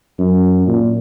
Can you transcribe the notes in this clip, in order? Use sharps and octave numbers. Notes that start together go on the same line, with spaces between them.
F#2
A#2